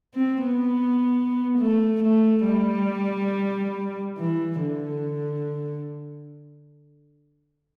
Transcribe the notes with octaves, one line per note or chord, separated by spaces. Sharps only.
C4
B3
A3
A3
G3
E3
D3